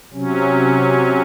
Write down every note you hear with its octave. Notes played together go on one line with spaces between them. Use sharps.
C3 F#3 C#4